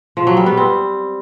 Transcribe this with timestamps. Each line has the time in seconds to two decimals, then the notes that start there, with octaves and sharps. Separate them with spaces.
0.17 F3
0.27 F#3
0.37 G3
0.46 B3
0.57 C4